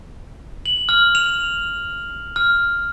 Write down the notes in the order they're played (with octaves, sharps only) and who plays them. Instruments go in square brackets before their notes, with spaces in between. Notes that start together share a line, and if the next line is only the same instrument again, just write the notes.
[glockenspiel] F#7
F6
F7
F6